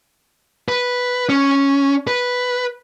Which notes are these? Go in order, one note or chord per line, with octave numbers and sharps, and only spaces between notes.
B4
C#4
B4